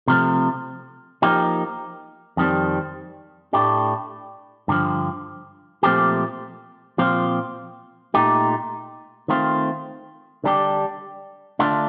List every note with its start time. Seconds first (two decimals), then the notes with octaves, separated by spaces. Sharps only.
0.08 C3 F3 A3
1.22 F3 A#3 D#4 G4
2.37 F2 D#3 G3 C4
3.53 A2 A3 D4 G4
4.68 G2 D3 F3
5.83 A#2 F3 A3 C4 G4
6.98 A#2 F3 C4 F4
8.14 A#2 A3 D#4 G4
9.28 D#3 A3 C4 F4
10.44 D3 G3 D4 G4
11.59 D3 A3 D4 F4